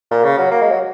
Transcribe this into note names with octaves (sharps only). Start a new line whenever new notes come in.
A#2
C#3
F#3
A#3
G#3
F#3